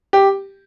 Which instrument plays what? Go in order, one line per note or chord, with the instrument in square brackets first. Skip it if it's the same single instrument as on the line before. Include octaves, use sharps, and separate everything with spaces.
[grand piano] G4